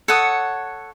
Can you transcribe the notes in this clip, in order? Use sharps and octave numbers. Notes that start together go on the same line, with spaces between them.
A4 C#5 F#5 D#6